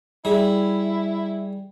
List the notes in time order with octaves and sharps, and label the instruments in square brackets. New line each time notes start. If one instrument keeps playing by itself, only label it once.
[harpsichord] G3 G#4 [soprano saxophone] E4